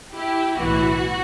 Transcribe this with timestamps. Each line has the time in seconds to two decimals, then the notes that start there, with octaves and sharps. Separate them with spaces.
0.13 E4 G4
0.58 B1 A2 E3 F#4